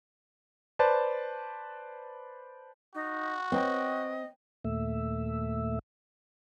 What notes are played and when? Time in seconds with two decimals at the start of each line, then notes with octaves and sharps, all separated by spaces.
0.79 B4 C5 D5 A5
2.95 D#4 F#4
3.52 C4 B4 C#5 D#5 G5
4.64 D#2 A#2 A3 E5